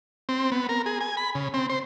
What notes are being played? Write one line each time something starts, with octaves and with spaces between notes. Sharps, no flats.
C4
B3
A#4
G#4
G#5
B5
C#3
C4
C5